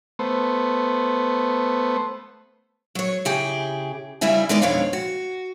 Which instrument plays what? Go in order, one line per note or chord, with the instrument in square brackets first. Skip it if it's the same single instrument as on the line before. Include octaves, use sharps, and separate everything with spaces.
[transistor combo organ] A3 B3 C5
[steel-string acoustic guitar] F#3 C#5
C#3 E4 G4 G#4
D2 C#3 G3 E4 E5 G#5
G#3 B3 D#4 D5
F2 B2 D3 C#5 F5
F#4